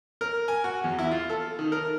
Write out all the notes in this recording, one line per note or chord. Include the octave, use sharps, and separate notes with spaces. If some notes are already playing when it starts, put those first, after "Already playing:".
A#4
G#5
F#4
E2
E4
F4
A4
D#3
A#4